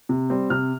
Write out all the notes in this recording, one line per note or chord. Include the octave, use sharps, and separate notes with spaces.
C3
G3 C4
C3 F6